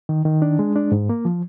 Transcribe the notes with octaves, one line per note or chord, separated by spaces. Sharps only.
D#3
D#3
D4
G#3
D4
G#2
A#3
F3